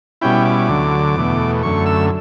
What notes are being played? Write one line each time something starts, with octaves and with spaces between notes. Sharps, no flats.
B2 G3 C#4 E4 G5
D6
D2 D3 F#3
E2 B2 A3
F#2 D3 A3 C#6
E6